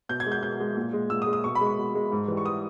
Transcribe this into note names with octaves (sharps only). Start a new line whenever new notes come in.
B2 G6
G#6
G#3
G6
B2 G6
G#3
A#2
G#3
A#2 E6
D#6
G#3
D#6
B2 C#6
B5
G#3
C#6
B2
G#3
G#2
E3 G3
C#6
D#6